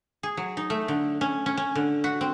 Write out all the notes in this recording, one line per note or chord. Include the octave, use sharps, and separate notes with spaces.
G#4
F#3
D#4
A3
D3
C#4
C#4
C#4
D3
F#4
C4